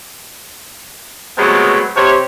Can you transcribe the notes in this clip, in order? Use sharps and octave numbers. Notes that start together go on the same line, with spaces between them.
C3 F#3 G#3 A3 B3
C3 C#5